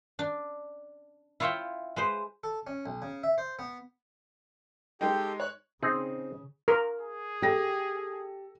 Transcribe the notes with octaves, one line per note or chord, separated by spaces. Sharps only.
D4
E4 F4 C#5 E5 G5
G#3 B4 C5
A4
C#4
B1
C#3
E5
C5
B3
G#3 D#4 G4 A4 G5
C#5 F#6
C#3 C4 D#4 G#4
A#4
G#4
G4 A4 A#6